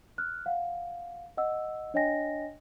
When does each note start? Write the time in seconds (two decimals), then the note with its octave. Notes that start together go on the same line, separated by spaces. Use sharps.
0.18 F6 F#6
0.46 F5 F#5
1.37 D#5 F#5 E6
1.94 D4 C#5 D#5 G5 G#5 A#6